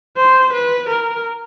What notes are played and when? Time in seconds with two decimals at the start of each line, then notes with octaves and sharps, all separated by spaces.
0.17 C5
0.53 B4
0.89 A#4